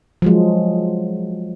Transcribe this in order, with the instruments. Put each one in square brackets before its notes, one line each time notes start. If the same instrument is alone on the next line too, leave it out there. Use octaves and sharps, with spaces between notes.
[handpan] F3 F#3 G#3